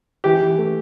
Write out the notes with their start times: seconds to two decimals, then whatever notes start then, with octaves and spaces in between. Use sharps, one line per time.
0.24 E3 G4
0.42 E3
0.58 A3